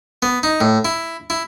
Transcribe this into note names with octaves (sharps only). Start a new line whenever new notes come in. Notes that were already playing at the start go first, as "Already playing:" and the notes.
B3
D#4
A2
E4
E4